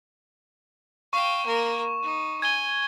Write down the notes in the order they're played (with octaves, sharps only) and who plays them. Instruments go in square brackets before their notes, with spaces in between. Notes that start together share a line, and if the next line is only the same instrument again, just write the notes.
[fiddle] F5 G5 [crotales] C#6 E7
[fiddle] A#3 A#4
D#4
[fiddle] G#5 [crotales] G#6 G7